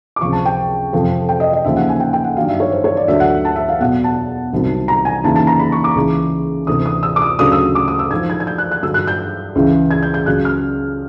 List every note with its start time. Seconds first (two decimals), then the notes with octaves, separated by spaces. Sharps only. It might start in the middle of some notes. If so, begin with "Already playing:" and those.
0.16 D6
0.21 C#2 C3 F3 C#6
0.32 A5
0.45 G5
0.93 F2 C3 F3
1.29 G5
1.40 D#5
1.53 D#5
1.64 D#2 C#3 F3 E5
1.76 F#5
1.89 G#5
2.00 G5
2.13 G5
2.24 F#5
2.37 G2 D#3 F#3 F5
2.49 E5
2.60 C#5
2.72 C5
2.84 C#5
2.97 D5
3.08 D2 D3 F#3 E5
3.20 F#5
3.45 A5
3.56 E5
3.69 F5
3.80 E2 B2 F#3 F#5
4.04 A5
4.53 C2 C3 D#3 F#3
4.88 A#5
5.05 G#5
5.23 D#2 C#3 E3 A5
5.36 A5
5.47 A#5
5.59 B5
5.72 C#6
5.84 D6
5.95 C#2 C#3 E3
6.67 D2 C3 E3 D#6
6.86 D#6
7.03 E6
7.16 D6
7.22 D#6
7.39 D2 C#3 F#3 D#6
7.52 E6
7.75 D6
7.88 D#6
7.99 E6
8.11 G#2 F3 G#6
8.30 G#6
8.40 G#6
8.47 G6
8.58 F#6
8.71 F#6
8.83 G2 D3 F#3 E6
8.94 F#6
9.07 G6
9.55 C#2 C#3 E3
9.91 G#6
10.03 G6
10.14 G6
10.26 C#2 C#3 F#3 F#6
10.45 F6